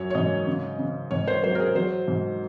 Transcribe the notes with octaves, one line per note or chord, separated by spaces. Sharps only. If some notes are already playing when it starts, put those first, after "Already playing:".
Already playing: F#2 F#3 C#5
C#5
G#2 D#5
C#3
C#3
G#2 C#5
C5
F#3 C5
A#4
G#4
F#3 C5
G#2